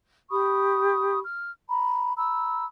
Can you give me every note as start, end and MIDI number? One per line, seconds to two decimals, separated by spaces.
0.30 1.19 67
0.30 1.19 83
0.30 1.19 85
0.30 1.19 87
1.24 1.51 89
1.69 2.12 82
1.69 2.12 83
2.17 2.65 82
2.17 2.65 83
2.17 2.65 88